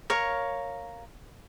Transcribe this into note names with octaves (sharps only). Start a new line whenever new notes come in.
A#4 C#5 F5 C#6